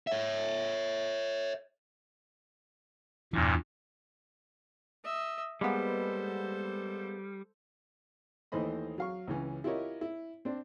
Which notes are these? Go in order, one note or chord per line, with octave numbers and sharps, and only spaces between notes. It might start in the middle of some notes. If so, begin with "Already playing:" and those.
C#5 E5
E2 G2 A#2 E3
D#5 E5
G3 G#3 A#3 B3 A4 C5
D#2 E3 A3 C5 D#5 B5
F#3 F5 C#6
C#2 E3 C#4
E4 F4 G4 A#4 C#5 D#5
E4
C4 D4